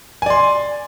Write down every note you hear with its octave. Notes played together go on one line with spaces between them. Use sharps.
D5 G#5 C6